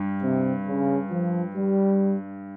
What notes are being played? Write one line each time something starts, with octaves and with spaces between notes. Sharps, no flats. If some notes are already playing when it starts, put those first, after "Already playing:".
Already playing: G2
C3
C#3
F3
G3